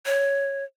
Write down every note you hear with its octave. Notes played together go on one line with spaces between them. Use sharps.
C#5